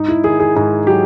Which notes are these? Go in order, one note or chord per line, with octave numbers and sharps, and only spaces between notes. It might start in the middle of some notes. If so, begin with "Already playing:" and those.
Already playing: G#2 D#4
E4
D#3 G#4
G#4
G#2 G#4
F#3 G4